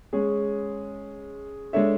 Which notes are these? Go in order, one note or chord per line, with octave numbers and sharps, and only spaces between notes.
G#3 C#4 G#4
G#3 D4 A4 C#5 E5